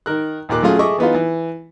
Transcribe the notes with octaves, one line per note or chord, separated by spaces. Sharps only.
D#3 A#4 F#6
D#2 A#2 A#3 D6 F#6
F#3 A3 C#4 F4 G#4
G#4 A4 D#5 E5 C#6 D6
E3 B3 D#4 F4
E3